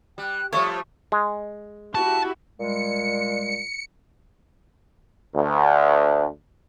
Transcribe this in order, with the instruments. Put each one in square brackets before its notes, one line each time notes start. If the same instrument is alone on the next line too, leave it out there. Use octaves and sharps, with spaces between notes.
[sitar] G3 [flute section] G5 F#6
[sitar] F3 G3 A3 [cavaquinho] C#5 [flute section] C#6
[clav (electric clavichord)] G#3
[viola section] E4 F#4 G4 [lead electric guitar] A5
[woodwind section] A#2 G3 G#3 [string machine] C#7
[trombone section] D2